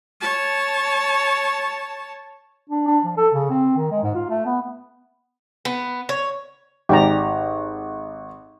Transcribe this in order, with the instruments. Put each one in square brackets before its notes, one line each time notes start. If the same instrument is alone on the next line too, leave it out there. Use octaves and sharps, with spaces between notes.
[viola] C#5 A5
[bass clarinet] D4
D4
F3
A4
C#3
C4
D#3
G#3
G#2
F4
A3
B3
[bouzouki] B3
C#5
[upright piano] G#1 [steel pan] G4 D5 A#5